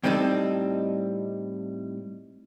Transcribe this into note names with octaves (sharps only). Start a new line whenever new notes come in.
A2 G3 C4 D#4 G#4 A4